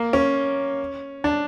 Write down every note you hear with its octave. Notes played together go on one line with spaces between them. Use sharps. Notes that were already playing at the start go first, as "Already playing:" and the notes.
Already playing: A#3
C#4
D4